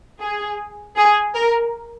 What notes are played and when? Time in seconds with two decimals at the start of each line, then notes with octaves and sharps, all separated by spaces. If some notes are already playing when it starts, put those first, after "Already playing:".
0.22 G#4
0.97 G#4
1.35 A#4